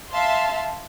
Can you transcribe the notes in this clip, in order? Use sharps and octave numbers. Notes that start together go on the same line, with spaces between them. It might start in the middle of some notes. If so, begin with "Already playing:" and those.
E5 F5 A5 C6